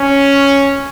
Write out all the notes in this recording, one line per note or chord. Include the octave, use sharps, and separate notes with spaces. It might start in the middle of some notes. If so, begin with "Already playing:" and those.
Already playing: C#4